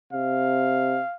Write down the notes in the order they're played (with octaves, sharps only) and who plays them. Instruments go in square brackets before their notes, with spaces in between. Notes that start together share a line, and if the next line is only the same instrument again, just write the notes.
[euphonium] C3 [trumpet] F5